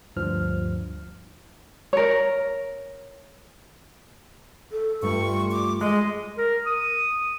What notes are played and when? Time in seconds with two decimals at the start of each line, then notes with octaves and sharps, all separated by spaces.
0.16 D2 G2 F3 F6
1.93 A#4 C#5
4.72 A4
5.02 G2 G3 A3 F4 C#6
5.52 D6
5.81 G#3 D#5
6.38 A#4
6.66 D#6